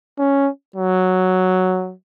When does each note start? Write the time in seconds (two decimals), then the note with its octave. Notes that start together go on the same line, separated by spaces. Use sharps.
0.19 C#4
0.76 F#3